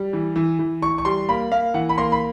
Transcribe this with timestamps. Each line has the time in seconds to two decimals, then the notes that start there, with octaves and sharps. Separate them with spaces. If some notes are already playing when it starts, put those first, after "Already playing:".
Already playing: G3
0.13 E3
0.36 E3
0.59 E3
0.82 E3 C#6
0.98 C#6
1.05 G3 C6
1.29 A#3 B5
1.52 A#3 F5
1.74 E3 F#5
1.89 B5
1.98 A#3 C6
2.12 B5